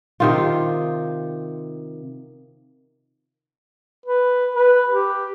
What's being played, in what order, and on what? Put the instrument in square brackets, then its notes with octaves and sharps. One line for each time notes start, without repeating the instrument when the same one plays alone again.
[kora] C3 D#3 F4
[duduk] B4
B4
G4